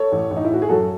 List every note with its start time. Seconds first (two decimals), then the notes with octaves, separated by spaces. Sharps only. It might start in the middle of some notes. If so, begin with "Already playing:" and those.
Already playing: A4 C#5
0.12 A1
0.31 A1
0.37 D#4
0.44 E4
0.50 A2 F#4
0.62 G#4
0.69 F#2 F#4 A4